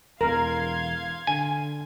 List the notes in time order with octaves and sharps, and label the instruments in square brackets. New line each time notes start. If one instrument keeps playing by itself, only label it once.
[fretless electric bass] E1 E2 [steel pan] A#4 [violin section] F5 C6 G#6
[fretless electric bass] D3 [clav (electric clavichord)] G#5